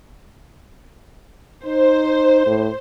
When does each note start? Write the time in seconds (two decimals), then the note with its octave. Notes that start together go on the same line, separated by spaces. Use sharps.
1.66 D#4 C5
2.47 A2